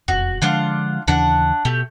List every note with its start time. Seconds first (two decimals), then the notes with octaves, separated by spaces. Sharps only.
0.08 E1 F2 F#4
0.42 D3 F3 G#3 D4 F4 F#5
1.08 D#2 C#3 E3 D4 F#5
1.65 B2 A3 G4